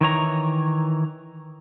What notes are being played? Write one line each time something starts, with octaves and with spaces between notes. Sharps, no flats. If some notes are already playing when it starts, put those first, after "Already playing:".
D#3 E3 C#5 A#5